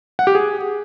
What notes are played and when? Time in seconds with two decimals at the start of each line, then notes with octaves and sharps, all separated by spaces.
0.19 F#5
0.27 G4
0.35 G#4